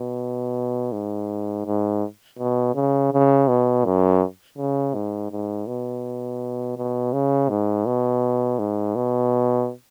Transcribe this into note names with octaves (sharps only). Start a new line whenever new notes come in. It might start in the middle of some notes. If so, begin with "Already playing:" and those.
Already playing: B2
G#2
G#2
B2
C#3
C#3
B2
F#2
C#3
G#2
G#2
B2
B2
C#3
G#2
B2
G#2
B2